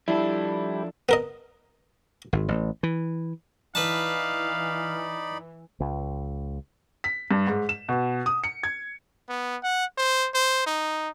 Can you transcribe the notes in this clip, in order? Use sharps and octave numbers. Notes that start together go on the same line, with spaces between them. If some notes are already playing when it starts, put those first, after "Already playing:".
F3 G3 D4 E4 A4
B3 A#4 D#5
G#1
A1
E3
E3 D#4 B4 D5 F5 A5 B5
C#2
B6
G2
G#2
E7
B2
D#6
C#7
G#6
B3
F#5
C5
C5
D#4